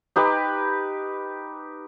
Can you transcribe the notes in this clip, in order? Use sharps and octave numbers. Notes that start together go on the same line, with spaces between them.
D#4 G4 B4